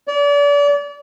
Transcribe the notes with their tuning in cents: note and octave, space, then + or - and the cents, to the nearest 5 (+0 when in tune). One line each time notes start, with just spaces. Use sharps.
D5 -35